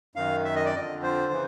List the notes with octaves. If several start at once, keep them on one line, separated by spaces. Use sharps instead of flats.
F#2 D#3 F5
E5
D#5
D5
F2 D3 D#5
C5
C#3 E3